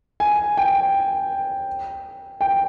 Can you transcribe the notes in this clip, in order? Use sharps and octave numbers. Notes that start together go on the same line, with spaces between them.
G#5
G5
G5